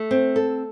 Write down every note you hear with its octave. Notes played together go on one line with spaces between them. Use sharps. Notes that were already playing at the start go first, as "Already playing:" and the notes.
Already playing: A3
C4
A4